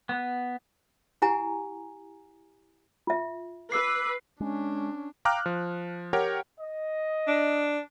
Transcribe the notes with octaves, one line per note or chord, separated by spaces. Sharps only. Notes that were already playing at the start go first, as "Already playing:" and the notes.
B3
E4 G4 F#5 G#5 A#5
F4 E5
B4 D6 E6 C7
G#3 C#4 D4
F5 G5 A#5 D6 F6 F#6
F3
G4 A#4 C#5 F#5 G5
D#5
D4